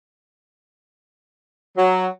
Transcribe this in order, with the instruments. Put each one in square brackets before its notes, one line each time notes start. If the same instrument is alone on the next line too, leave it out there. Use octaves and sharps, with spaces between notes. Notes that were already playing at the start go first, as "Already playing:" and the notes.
[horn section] F#3